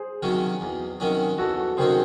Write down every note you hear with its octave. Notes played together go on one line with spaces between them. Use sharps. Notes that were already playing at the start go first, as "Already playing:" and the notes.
Already playing: G#4 C5
C3 D#3 F#3 C#4
E2
C3 D#3 F#3 C#4
E2 F#4 A4
F#4
C3 D#3 F#3 C#4 G#4 C5